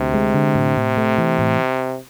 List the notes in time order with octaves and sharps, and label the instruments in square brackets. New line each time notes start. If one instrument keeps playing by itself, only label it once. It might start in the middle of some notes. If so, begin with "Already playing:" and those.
Already playing: [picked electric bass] D2 [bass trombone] C3
[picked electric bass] G#3
D3
A2
A2
A3
E3
A2